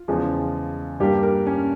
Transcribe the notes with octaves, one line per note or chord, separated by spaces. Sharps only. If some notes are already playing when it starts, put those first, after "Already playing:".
Already playing: F4
E2 C#3 F3 G#3
G2 G3 A#3 G4
A#4
C#4